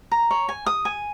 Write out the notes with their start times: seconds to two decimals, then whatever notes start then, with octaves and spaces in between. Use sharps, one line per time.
0.11 A#5
0.31 C#5
0.49 G#5
0.66 D#6
0.85 G#5